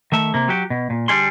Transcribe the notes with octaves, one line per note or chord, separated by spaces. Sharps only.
D#3 A3 E5
C3 A#3
F#3 F#4 G4
B2
A#2
D3 G3 G#4 C6